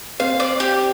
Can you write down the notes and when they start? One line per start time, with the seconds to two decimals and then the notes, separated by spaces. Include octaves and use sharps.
0.20 C4 F5
0.40 D5
0.60 G4